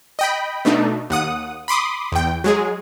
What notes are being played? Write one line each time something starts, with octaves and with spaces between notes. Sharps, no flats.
D#5 G5 B5
B2 A3 D4 D#4
D#2 F#5 D#6
B5 C6 D6 D#6
E2 G5
F#3 G#3 G#4